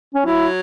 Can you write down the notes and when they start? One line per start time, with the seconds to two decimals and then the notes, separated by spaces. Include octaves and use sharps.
0.15 C#4
0.26 F#3 E4